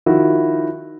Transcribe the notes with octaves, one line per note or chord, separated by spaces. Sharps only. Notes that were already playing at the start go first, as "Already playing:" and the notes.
D#3 F3 E4 F#4